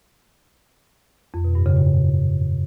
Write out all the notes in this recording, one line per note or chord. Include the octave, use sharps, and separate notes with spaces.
F2
B2
G2
C#3
A#2